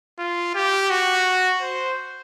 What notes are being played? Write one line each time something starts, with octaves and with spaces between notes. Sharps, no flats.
F4
G4
F#4
C5